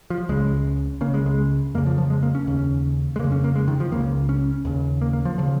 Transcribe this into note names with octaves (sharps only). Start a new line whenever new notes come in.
F3
C#2 C#3 G#3
C#2 C#3 A#3
G#3
G#3
F2 C#3 A#3
F3
F3
G#3
A#3
C#4
D#2 C#3
G#3
F2 C#3 A#3
C#4
A#3
G#3
D#3
F3
C#2 C#3 A#3
C#4
D#2 C#3
A#3
A#3
F3
C#3 F3